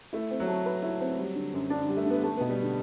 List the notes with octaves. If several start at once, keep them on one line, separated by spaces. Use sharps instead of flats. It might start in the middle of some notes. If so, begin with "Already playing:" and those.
A3 E4
C4
F#3
A3
B4
E4
C4
G3
D3
F#2
D3 D4
D3 G3
A3
D3 B3
A3
B2 B3
G3
D3